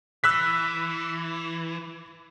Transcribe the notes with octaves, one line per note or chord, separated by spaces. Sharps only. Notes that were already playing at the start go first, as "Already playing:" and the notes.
E3 E6 F#6 B6